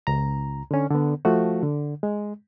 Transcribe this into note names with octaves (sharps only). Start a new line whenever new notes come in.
C#2 A#5
D3 C#4
D3 B3
F3 A3 F#4
D3
G#3